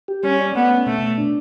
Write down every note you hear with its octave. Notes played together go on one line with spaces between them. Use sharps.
G4
G3 C#4
D5
A3 B3
C#4
B2 A3
B2
D4